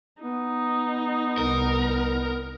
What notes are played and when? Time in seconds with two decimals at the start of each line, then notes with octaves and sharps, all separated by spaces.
0.22 B3 D#4
1.38 C2 A#4